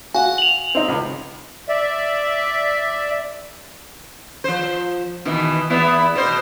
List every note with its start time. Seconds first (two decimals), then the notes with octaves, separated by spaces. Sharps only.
0.14 F#4 F5 G#5
0.38 F7 F#7
0.75 C4 D#4
0.88 C#2
1.69 D5 E5
4.44 F3 C5
5.25 B2 D#3 E3
5.70 E2 B3 E4
6.15 B2 C5